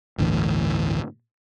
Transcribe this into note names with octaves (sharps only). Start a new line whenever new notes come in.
G1 D2 A2 E3